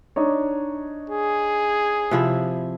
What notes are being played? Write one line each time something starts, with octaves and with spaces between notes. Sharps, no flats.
D4 D#4 C#5
G#4
C3 F3 E4